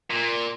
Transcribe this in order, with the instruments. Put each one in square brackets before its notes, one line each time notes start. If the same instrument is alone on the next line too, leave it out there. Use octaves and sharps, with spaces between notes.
[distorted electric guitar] A#2